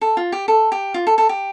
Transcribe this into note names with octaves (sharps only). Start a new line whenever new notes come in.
A4
F4
G4
A4
G4
F4
A4
A4
G4